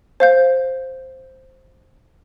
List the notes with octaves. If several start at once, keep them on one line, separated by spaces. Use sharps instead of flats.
C5 F5 G6